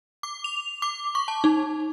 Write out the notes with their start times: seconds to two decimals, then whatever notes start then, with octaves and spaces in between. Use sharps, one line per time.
0.23 D6
0.44 F7
0.82 D6
1.15 C#6
1.28 A5
1.44 D#4